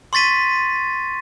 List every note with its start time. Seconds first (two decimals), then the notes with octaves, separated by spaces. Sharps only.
0.13 C6 C#6 A6 B6 D#7